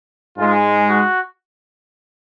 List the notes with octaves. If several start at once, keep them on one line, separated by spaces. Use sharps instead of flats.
G#2 G#3 F4
F#4